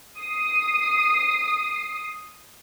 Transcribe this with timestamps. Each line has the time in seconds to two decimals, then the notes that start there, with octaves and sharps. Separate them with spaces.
0.20 D#6 C7